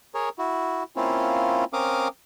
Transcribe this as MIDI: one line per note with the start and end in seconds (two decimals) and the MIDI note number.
0.15 0.29 68
0.15 0.29 70
0.15 0.29 73
0.39 0.83 64
0.39 0.83 66
0.96 1.64 58
0.96 1.64 60
0.96 1.64 61
0.96 1.64 64
0.96 1.64 65
1.73 2.08 60
1.73 2.08 61
1.73 2.08 70
1.73 2.08 77
1.73 2.08 86
1.73 2.08 87